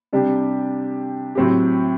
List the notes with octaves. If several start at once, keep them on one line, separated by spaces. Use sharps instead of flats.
C3 G3 D4 G4
A2 F#3 C4 G4